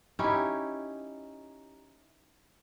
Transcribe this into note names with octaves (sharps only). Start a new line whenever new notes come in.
C#4 D#4 E4 G4